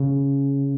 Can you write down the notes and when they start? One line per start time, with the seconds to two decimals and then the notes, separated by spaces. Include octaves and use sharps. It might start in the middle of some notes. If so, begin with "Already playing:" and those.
Already playing: C#3